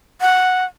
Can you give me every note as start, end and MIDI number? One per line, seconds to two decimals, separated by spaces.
0.21 0.65 78